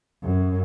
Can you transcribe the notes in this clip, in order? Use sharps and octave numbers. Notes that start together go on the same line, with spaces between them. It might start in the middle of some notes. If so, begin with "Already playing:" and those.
F#2